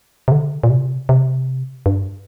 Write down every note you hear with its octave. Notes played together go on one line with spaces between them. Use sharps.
C3
D3
A#2
C3
C3
G2